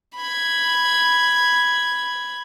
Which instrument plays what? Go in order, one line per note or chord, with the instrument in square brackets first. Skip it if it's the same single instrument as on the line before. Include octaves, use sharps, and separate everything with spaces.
[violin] B5 G#6